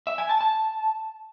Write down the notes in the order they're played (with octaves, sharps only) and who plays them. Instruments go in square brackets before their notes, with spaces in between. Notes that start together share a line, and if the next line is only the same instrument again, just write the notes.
[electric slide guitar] E5
G#5
A5
A5